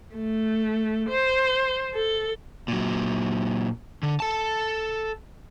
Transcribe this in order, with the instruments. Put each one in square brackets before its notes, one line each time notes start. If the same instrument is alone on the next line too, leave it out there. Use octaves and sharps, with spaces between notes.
[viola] A3
C5
A4
[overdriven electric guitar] A#2 F#3
D3
A4 A5